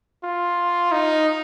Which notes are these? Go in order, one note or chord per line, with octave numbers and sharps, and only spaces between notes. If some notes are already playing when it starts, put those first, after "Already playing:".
F4
D#4